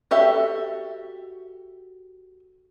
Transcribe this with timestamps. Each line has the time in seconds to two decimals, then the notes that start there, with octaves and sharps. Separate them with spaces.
0.11 F#4 G4 A4 E5